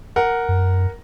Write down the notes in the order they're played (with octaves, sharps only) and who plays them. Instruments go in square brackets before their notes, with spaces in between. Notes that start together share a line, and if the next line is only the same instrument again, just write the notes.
[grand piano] A#4 F#5
[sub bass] F#2